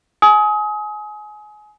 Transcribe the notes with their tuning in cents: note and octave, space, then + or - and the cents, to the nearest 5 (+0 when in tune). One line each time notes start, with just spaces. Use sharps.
G#5 +25 D#6 +30